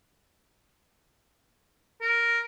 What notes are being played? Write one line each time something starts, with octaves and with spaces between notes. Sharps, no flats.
A#4